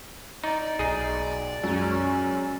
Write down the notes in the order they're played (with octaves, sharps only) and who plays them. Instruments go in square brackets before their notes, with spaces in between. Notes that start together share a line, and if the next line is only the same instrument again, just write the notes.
[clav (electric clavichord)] D#4 [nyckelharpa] D5
[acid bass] B1 [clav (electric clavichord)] D#4 G#4
[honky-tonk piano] F#2 G#3 [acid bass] C#4